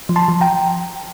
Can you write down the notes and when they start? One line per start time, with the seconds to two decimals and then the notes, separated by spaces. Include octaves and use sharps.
0.09 F3
0.16 A5 C6
0.28 F3
0.41 G5 A#5